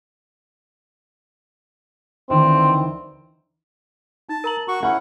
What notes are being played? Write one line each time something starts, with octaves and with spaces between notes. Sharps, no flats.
D2 D#3 E3 C4
D#4 A5
A#4 A#5 F#7
F#4 C#6
C#4 E4 F#5